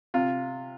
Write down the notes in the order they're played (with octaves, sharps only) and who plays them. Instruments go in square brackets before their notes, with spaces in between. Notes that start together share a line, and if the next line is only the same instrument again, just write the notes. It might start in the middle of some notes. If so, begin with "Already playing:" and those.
[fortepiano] C3 F4